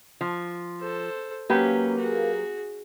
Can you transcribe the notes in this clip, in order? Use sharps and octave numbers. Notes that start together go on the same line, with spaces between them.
F3
A4 C5
F#3 A#3 C#4 G4 B4
F#4 G#4